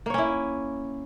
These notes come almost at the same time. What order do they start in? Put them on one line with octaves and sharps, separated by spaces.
A#3 C#5 C#4 E4